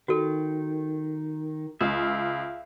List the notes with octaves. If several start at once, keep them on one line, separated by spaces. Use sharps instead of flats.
D#3 F#4 A4
C#2 E5 F5